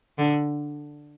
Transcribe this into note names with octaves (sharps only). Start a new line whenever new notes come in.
D3